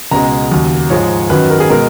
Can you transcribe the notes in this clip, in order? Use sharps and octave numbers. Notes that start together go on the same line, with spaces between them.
C#2 B2 G#3 A#5
D#2 C#3 F#3
G#2 F3 G#3 C#5
F#2 D#3 F#3 B4
A#4
G#4
B2 G#3 A#4